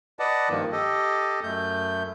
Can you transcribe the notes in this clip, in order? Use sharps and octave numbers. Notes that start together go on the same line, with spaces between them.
B4 D5 D#5 F#5 A5
G2 D#3 F3 A#3
G4 A4 D#5
F#2 A3 G6